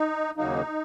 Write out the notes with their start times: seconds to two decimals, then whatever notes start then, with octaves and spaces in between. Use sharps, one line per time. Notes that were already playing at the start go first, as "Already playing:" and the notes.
Already playing: D#4
0.37 D#2 C#3 F#3 A#3 D#4